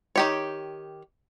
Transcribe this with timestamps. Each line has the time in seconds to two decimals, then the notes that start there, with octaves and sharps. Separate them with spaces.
0.16 D#3 G4 C#5